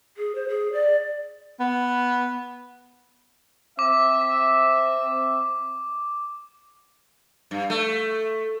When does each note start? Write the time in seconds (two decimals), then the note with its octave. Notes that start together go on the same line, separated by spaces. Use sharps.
0.17 G#4
0.35 C5
0.49 G#4
0.73 D5
1.60 B3
3.79 C4 E5 D6
7.51 G2
7.70 A3